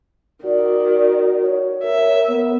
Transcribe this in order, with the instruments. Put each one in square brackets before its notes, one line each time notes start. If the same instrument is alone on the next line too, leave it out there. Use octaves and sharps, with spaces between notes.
[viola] D#3 [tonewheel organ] F#4 [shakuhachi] D5
[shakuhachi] C#5
[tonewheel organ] A#4 [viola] E5
[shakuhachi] B3